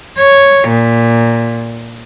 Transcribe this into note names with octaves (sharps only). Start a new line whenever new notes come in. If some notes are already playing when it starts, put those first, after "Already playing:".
C#5
A#2